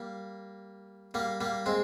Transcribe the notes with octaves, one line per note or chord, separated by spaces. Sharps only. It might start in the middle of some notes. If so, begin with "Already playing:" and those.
Already playing: G3 A#3
G3 A#3
G3 A#3
G#3 C4